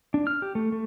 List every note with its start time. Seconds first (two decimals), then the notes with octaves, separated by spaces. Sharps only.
0.14 D4
0.27 F6
0.42 G4
0.55 A3
0.72 A3